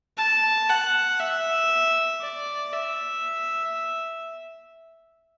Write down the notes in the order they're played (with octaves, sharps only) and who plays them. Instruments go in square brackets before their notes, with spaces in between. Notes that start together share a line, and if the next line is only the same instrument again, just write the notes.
[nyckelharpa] A5
F#5
E5
D5
E5